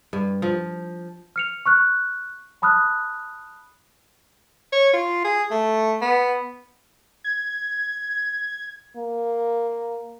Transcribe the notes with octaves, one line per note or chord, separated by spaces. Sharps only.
G2
F3
F6 C#7 F7
C#6 F6 F#6
A5 B5 D#6 F6 F#6
C#5
F4
G#4
A3
B3
G#6
A#3